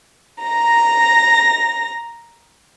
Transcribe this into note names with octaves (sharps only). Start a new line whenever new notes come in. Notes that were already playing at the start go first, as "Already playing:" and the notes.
A#5 A#6